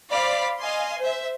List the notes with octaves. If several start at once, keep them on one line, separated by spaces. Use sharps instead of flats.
C5 D5 F5 B5
D#5 F5 G#5 C6
C5 E5